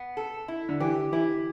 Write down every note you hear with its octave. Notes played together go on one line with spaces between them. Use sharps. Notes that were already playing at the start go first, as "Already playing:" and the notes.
Already playing: B3
A4
E4
D3
E3 G4
E3 E4